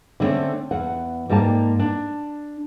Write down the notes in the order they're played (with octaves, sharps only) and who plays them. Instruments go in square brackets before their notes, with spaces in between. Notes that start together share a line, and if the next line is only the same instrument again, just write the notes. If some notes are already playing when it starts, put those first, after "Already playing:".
[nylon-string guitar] D3 G3 A3 A#3 C4 C#4
E2 F#5
G#2 G3 A#3 G4 A5
D4